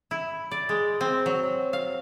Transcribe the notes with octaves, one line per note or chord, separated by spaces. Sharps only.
E4
D5
G#3
C4
F#3
F5